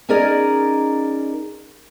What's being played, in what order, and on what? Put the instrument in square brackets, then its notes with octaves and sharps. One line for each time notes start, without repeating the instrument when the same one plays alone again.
[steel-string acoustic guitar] C#4 D#4 G#4 A#4 D5 D#5